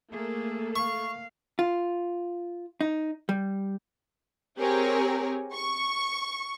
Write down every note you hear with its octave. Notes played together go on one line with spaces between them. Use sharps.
A3 A#3 G#4 A4
F5 C#6
F4
D#4
G3
C4 G4 G#4 A#4 C#5
C#6